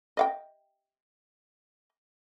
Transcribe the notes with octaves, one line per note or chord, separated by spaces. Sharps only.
D#5 F5 G5